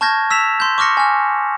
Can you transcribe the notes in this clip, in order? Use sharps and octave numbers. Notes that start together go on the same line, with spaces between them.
A5 C#6 F6 G6 G#6 A#6
E6 B6 E7 F7
C6 G6
C#6 D6 F6 A#6 C#7
G#5 F6